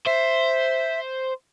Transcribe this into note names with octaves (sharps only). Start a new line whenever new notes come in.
C5 E5